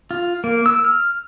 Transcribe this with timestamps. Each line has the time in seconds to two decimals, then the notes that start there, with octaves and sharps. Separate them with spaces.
0.11 F4
0.44 A#3
0.66 E6
0.85 F6